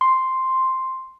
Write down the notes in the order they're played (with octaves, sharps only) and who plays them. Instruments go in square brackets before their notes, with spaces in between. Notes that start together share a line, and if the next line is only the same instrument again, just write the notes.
[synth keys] C6